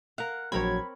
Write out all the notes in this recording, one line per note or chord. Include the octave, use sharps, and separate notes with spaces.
A#4 F5 F#5
A#1 F#3 C4 A#4 C#5 B5 G#6